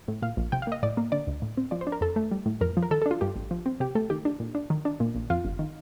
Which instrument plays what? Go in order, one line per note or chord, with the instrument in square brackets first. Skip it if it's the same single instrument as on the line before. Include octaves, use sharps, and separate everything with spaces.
[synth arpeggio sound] A2
A#2 F5
A#1
C3 G5
F5
A#3 D#5
A2 D5
A#3
D3 D5
D2
A2
C4
F3 D5
C5
D4
A#4
F2 A4
A3
G3
A2
F2 A#4
F3
A#4
D#3 A4
A4
D4
F4
G2 G4
A1
F3
C4
C3 G4
A3 A4
D#3 G4
D4
A#2
D4
D#3
D4
A#2
A#1
F2 F4
G1
D#3